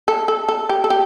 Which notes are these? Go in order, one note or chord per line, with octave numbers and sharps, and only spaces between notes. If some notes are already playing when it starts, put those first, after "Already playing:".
A4
A4
A4
G4
A4
G4